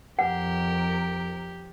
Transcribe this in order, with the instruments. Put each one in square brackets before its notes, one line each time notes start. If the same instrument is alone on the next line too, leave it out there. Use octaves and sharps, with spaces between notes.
[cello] F2 A#4 [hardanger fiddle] G4 [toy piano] F#5